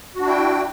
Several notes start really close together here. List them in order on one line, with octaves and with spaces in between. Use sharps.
F#4 D4 E4 G5